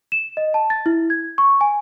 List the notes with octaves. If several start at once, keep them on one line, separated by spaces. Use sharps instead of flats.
E7
D#5
A5
A6
E4
G#6
C#6
G#5